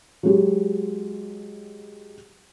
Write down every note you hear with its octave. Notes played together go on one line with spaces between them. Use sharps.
F#3 G#3 G4